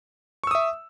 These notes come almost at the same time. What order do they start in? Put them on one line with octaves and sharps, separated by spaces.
C#6 E6 D#6 E5